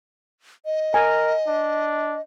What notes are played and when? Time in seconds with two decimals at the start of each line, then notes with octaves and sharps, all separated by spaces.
0.65 D#5
0.94 A#4 G#5
1.47 D4